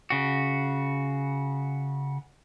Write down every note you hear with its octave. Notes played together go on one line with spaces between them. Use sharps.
C#3 F#4